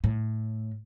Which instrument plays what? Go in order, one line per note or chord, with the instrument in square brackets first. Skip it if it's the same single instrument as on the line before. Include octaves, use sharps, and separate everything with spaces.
[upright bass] A2